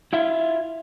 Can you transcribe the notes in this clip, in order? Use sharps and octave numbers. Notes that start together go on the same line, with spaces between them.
E4 F4 E5